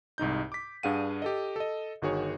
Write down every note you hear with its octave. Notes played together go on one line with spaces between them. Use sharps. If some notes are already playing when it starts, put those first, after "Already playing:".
C2 G#2 D#4 G6
D6 B6
G2 D4 G#4 F5 F#5 D#7
G4 A4 D#5
A4 D#5
G1 D#3 F#4 G#4 C#5